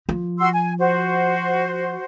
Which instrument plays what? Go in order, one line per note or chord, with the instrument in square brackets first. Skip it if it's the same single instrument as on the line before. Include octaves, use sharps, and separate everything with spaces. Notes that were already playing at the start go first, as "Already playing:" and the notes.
[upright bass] F3
[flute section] F#4 C6 E6
G#5
F#4 C5